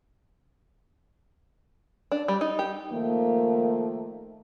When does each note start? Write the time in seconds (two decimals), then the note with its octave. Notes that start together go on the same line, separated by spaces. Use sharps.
2.12 D4
2.28 G3
2.41 D#4
2.59 G4
2.92 D#3 F3 A3 A#3